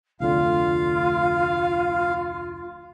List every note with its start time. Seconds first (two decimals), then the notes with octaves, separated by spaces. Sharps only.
0.20 F1 D2 D3 F4 F5